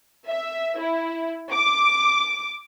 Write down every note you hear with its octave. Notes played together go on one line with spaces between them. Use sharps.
E5
E4
D6